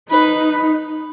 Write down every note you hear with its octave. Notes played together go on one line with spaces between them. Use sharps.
D#4 B4